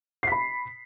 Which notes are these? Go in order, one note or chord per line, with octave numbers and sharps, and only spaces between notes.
B5 B6 C7